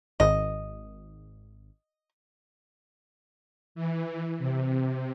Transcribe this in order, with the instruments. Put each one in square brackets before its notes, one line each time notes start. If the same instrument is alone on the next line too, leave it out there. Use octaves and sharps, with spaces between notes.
[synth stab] G#1 [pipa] D#5
[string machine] E3
C3